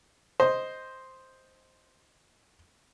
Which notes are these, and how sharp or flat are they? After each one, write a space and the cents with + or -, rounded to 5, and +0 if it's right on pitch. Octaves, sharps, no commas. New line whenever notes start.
C5 +0 D#5 +0